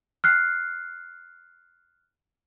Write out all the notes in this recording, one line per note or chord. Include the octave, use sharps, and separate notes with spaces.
F6 F#6 C7